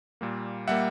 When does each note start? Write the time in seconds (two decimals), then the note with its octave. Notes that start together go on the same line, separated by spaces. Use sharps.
0.21 A#2 G3 A#3
0.67 A#2 G3 A#3 E5 F#5